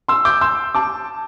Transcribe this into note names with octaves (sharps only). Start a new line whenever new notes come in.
C6 E6
D6 G6
C6 E6
A5 D6